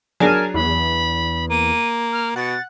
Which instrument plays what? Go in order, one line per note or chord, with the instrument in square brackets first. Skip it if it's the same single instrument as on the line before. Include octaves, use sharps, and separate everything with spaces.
[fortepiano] F#3 D4 G#4 [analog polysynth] A#4 G#5 A5
[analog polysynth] E2 [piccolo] B5
[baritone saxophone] A#3 [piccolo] D#7
[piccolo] F6
[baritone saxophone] B2 [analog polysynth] F#5 [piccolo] A6